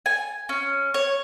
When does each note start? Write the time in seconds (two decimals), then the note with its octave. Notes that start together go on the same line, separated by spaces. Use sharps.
0.06 G#5
0.49 C#4
0.94 C#5